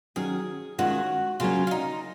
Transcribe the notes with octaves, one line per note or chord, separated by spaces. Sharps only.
D#3 F#3 C#4 G#4
D#3 G#3 C#4 F4 F#4
C#3 F#3 A#3 C#4 F4
F4
D#4